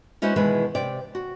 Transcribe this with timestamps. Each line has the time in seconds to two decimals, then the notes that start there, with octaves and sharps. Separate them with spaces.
0.22 G#3 C#4 E4 F#4 B4 C5
0.36 B2 D#3 E3 G#3 E4 B4
0.75 C3 D5 G5
1.15 F#4